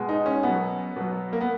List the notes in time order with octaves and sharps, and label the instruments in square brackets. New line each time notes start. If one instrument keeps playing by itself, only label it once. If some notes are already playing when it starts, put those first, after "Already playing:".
Already playing: [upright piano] B2 G#3
D#4
C#4
B2 B3
F#3
B2 F#3
A#3
B3